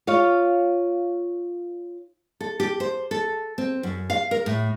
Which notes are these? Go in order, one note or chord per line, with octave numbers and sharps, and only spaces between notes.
F4 C#5 F5
A4
G4
C5
A4
C4
F#2
F5
A#4
A2